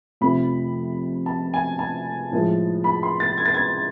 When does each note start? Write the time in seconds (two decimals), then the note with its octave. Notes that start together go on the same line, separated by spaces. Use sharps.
0.21 F2 C3 F3 A3 B5
1.26 A5
1.54 G#5
1.79 A5
2.32 A2 F3 G#3
2.84 B5
3.03 C6
3.20 A6
3.38 G#6
3.45 A6
3.54 G#6